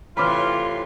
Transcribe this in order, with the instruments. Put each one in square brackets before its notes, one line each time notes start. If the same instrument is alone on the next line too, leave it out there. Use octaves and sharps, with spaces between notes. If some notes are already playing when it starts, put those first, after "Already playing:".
[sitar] A2 C3 E3 [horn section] F4 [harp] B5 D6 F6 [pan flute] C6